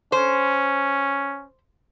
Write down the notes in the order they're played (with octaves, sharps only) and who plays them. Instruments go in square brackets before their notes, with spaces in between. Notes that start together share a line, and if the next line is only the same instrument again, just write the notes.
[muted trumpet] C#4 [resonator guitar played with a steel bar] C5